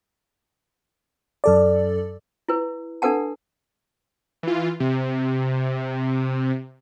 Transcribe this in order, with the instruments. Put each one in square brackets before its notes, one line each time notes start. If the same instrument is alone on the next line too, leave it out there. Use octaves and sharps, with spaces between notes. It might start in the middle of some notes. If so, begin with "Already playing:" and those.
[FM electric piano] F#2 A4 D5
[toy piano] E4 B4
D4 A4 B4 F#5 A5
[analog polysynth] E3 F4
C3